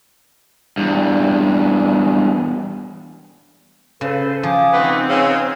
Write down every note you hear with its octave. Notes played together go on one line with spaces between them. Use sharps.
E2 G2
C#3 A4 B4 C5
F3 G#5 D6 D#6
A3 B3 C4 D#4
C#3 G#4 E6